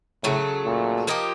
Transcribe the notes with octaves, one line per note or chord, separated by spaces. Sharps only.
A2 C#3 F#3 A3
A#2
F3 A#3 D#4 G4